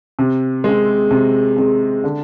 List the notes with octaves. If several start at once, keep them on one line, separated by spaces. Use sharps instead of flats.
C3
G#3 C4
C3
G#3 C4
D3